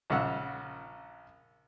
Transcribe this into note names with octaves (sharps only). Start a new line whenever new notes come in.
A#1 C#3 F#5 E6